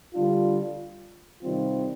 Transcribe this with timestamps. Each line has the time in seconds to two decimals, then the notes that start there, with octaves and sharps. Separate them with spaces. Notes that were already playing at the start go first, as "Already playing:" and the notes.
0.15 D3 G3 D4 F4
1.42 C3 D#3 G3 C4 F4